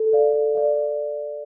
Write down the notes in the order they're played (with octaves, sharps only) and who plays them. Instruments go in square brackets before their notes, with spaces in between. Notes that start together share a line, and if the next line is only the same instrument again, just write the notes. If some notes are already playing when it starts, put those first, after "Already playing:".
Already playing: [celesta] A4
D5 F5
A4
D5 F5